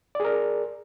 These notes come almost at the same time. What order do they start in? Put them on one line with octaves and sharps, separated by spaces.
D5 G#4 A#4